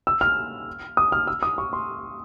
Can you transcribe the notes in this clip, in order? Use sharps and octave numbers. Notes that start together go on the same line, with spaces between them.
E6
F6
D#6
F6
E6
D#6
C#6
C6